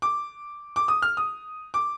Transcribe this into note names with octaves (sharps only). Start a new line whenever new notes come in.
D6
D6
D#6
F6
D#6
D6